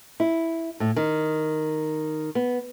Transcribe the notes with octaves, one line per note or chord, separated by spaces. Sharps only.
E4
A2
D#3
B3